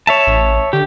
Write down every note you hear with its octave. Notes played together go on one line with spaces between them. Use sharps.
C#5 E5 A5
A1
D3 G4